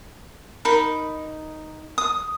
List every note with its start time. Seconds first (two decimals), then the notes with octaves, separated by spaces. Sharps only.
0.65 D#4 A#4 B5
1.98 D#6